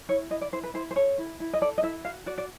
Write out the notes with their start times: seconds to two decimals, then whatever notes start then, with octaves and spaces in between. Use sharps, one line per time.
0.09 E4 C#5
0.30 E4 D#5
0.41 D5
0.52 E4 C5
0.64 B4
0.74 E4 C5
0.91 C5
0.96 A4 C#5
1.18 E4
1.40 E4
1.53 D#5
1.61 A4 D5
1.78 D#5
1.83 E4 E5
2.05 F#4 F5
2.26 F#4 D5
2.38 D5